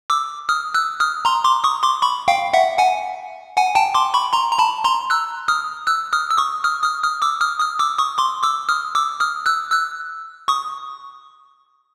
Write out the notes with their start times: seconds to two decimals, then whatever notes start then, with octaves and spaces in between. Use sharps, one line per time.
0.10 D6 E6
0.49 D#6 F6
0.74 E6 F#6
1.00 D#6 F6
1.25 A#5 C6
1.45 C6 D6
1.64 C#6 D#6
1.83 C6 D6
2.02 B5 C#6
2.28 F5 G5
2.53 E5 F#5
2.79 F#5 G#5
3.56 F#5 G#5
3.75 G5 A5
3.94 C6 D6
4.14 B5 C#6
4.33 A#5 C6
4.52 A#5
4.59 A5 B5
4.84 A#5 C6
5.10 E6 F#6
5.48 D#6 F6
5.87 E6 F#6
6.13 D#6 F6
6.31 E6
6.38 C#6 D#6
6.64 D#6 F6
6.83 D#6 F6
7.03 D#6 F6
7.22 D6 E6
7.41 D#6 F6
7.60 D#6 F6
7.79 D6 E6
7.98 C#6 D#6
8.18 C6 D6
8.43 D6 E6
8.69 D#6 F6
8.95 D6 E6
9.20 D#6 F6
9.46 E6 F#6
9.72 E6 F#6
10.48 C#6 D#6